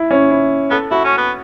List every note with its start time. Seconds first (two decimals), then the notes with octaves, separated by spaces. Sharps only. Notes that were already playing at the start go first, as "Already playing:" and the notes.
Already playing: E4
0.11 C#4
0.31 E4
0.71 B3 A4
0.91 E4 F#4
1.04 C#4
1.18 B3